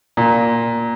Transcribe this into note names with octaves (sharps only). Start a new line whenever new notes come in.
A#2